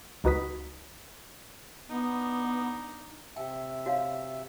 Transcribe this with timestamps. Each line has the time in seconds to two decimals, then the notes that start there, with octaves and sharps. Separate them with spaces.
0.24 C#2 D#4 F#4 B4 D#6 B6
1.90 B3 D4 D#4
3.36 C3 E5 G5
3.86 F#4 C#5 F5